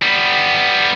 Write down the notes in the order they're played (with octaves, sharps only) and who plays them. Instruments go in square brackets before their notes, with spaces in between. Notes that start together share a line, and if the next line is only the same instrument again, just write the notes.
[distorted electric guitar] G3 B3